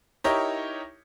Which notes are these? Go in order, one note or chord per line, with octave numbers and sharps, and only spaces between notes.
D#4 E4 G4 A#4 C#5